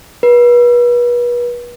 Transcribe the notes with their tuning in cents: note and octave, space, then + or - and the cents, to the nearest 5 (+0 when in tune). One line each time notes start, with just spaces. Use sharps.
B4 -35